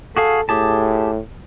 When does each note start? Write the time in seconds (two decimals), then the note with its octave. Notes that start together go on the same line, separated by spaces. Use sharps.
0.17 F#4 G#4 A4 F5
0.49 A2 G4 G#4 A5